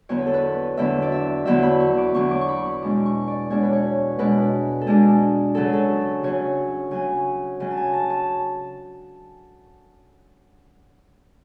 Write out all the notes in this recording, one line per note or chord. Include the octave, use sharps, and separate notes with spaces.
E2 D3 F#3 B3 C#5
B4
A4
B4
E2 D3 F#3 B3 E5
D5
E5
E2 D3 F#3 B3 E5
B5
C#6
D6
E2 D3 F#3 B3 C#6
D6
C#6
B5
D6
B2 G#3 D4
C#6
D5
B2 G#3 D4 C#5
B4
C#5
B2 G#3 D4 B4
A4
B2 G#3 D4 G#4
C#3 F#3 C#4 A4
G#4
A4
C#3 F#3 C#4 C#5
C#3 F#3 C#4 G#5
C#3 F#3 C#4
A5
G#5
A5
A5